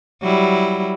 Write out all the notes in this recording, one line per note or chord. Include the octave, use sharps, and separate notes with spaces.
F#3 G3 E4